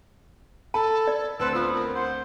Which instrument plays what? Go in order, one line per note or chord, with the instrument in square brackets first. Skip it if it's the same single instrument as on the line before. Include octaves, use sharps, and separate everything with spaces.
[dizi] A4 [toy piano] A5 [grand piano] B5
[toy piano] D5
[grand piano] D2 C4 C6 [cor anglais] A4 [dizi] B4
[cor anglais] B3 [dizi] F4
[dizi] A#4
[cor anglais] C5 [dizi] F#5